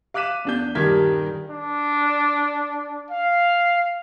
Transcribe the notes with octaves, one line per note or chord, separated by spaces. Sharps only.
F5 D6 F#6 B6 D#7 E7
E2 D4 G6
D#1 G2 D#3 A#4 G#6 B6
D4
F5